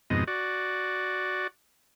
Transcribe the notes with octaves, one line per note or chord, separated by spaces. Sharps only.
F2 G#2 B2 D#5
F#4 D5